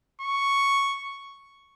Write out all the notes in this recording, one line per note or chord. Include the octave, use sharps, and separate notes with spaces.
C#6